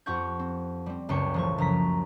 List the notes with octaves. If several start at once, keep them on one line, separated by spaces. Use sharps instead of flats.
F2 F4 G4 F#5 C#6 G6
C4
G3 C4
F#1 C#2 F#2 G5 C#6 C#7
A1 F3 C#6
F#1 F#2 A#5 B6